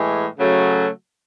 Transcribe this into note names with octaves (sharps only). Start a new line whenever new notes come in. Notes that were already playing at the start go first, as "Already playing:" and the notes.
Already playing: A2 E3 G#3
C#3 F#3 A3